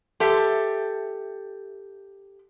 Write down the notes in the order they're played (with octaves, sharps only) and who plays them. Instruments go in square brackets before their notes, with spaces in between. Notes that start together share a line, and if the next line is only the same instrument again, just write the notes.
[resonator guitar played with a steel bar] G4 A4 E5